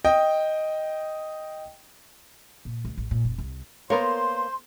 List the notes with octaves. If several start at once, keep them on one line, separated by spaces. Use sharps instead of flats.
D#5 G5
A#2
D2
A1
A#2
F1
C2
A#3 B3 A#4 C5 C#5 C6